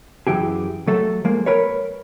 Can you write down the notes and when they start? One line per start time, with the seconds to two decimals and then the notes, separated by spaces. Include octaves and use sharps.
0.27 F#2 E3 G4 G#4
0.87 F#3 A3 A4
1.24 F3 G#3 A#3
1.46 A#4 B4 C#5